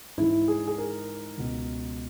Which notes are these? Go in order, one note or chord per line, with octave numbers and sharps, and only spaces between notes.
G#2 E3 E4
G#4
G#4
A#4
C#2 B2